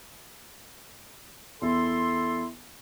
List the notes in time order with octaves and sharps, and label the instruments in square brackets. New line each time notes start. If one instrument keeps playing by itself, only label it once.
[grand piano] E2 [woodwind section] E4 A4 C6